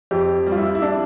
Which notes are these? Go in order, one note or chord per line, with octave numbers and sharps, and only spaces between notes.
F2 G4
G3
F4
E4
E4
D4